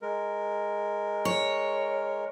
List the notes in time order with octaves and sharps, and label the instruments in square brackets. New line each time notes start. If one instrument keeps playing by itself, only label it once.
[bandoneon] G#3 A#4
[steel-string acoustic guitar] C#5